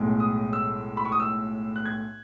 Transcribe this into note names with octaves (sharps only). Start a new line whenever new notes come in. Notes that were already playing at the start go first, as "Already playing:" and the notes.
Already playing: B1 A2 G#3
D#6
E6
B5
C#6
D#6
E6
F#6
G#6